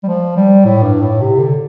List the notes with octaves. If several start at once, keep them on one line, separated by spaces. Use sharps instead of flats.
G3
F3
G3
A2
G2
A2
C3
D3